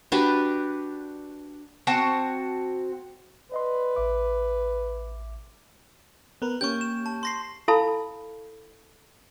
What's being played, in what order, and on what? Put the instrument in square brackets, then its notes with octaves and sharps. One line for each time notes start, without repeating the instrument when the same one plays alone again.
[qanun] D4 F#4 G4 B4
[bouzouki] C4 F#4 F#5 A5
[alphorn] B4 [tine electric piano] D5 D#5 C6
[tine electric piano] A1 E5 D6
[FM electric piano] B3 A#4 B4
[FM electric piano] A#3 C#4 G4 [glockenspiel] C#6 G6
[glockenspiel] E7
A5
C6 A#6 C7
[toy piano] E4 A4 F5 A5 B5